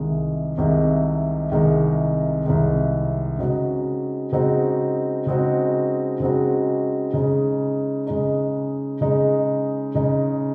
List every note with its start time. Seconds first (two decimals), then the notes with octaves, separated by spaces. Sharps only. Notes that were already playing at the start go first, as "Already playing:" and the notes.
Already playing: C2 C3 D#3 G#3
0.58 C2 C3 D#3 G#3
1.52 C2 C3 D#3 G#3
2.45 C2 C3 D#3 G#3
3.39 C#3 G#3 C4 D#4 F#4
4.32 C#3 G#3 C4 D#4 F#4
5.26 C#3 G#3 C4 D#4 F#4
6.20 C#3 G#3 C4 D#4 F#4
7.14 C#3 G#3 D#4
8.07 C#3 G#3 D#4
9.01 C#3 G#3 D#4
9.94 C#3 G#3 D#4